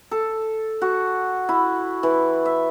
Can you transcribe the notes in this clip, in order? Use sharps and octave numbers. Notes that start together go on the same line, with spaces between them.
A4
F#4
E4
E3
E5